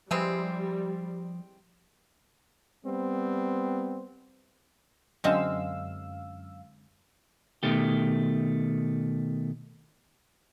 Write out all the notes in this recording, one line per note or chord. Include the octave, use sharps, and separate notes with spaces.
E3 F3 G3 G#3 C4
G3 B3 C4
F#2 D3 G#3 C4 F5 E6
B2 D#3 A3 G4